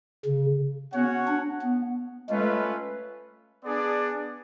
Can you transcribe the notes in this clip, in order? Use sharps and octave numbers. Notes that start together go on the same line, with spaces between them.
C#3
B3 C#4 F#4 C#5 F#5
D4
B3
G#3 A3 C#4 F4 B4
B3 D4 G#4 D5